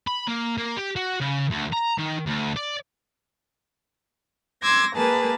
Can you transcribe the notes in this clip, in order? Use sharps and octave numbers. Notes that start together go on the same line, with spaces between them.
B5
A#3
A#3
G4
F#4
C#3
D2
A#5
D#3
D2
D5
C6 D6 E6 G#6 A#6
A#3 G#4 B4 A5